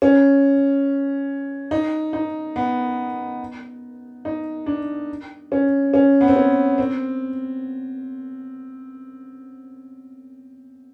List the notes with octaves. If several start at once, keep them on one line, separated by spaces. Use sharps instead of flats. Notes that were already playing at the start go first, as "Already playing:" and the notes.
C#4
D#4
D#4
B3
D#4
D4
C#4
C#4
B3
C4
C#4
C4